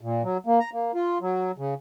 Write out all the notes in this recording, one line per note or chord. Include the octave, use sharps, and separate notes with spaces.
A#2
F#3
A#3
A#5
A#3
F4
F#3
C#3